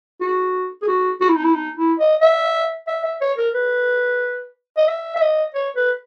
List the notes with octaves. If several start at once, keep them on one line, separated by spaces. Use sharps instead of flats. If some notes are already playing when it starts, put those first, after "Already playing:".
F#4
G#4
F#4
F#4
E4
D#4
E4
D#4
E4
D#5
E5
E5
E5
C#5
A#4
B4
D#5
E5
E5
D#5
C#5
B4